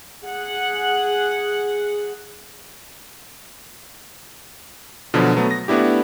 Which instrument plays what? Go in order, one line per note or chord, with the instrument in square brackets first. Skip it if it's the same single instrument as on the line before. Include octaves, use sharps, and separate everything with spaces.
[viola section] G#4 F#5
[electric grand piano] B2 D3 F3 F#3
F#3 A3 B3
A#6
A3 B3 D4 E4 G4